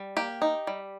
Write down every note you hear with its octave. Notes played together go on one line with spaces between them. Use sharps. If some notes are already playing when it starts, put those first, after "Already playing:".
Already playing: G3
A#3 G4
D#4
G3